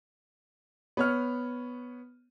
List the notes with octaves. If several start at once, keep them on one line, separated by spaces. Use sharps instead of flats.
B3 C#5 F6